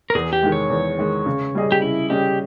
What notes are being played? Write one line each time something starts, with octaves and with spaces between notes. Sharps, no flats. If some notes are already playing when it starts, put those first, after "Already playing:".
A#4
E2 G#4
G4
D#3 G#3
C#5
E2
D#3 G#3
C#3
G3 C#4 G#4 D#5
G4
C#3 E4
G3 C#4 G4 G#4 D#5